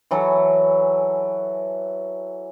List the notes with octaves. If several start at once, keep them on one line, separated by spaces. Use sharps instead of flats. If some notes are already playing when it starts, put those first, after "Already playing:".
E3 F#3 G#4 A4